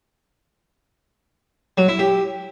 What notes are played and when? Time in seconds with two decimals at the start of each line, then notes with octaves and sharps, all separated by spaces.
1.78 F#3
1.88 E4
1.99 G4